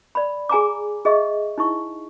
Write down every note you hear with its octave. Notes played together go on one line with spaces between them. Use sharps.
D5 B5
G#4 G#5 A#5 D6
G#4 D#5 E5 C#6
D#4 E4 C#6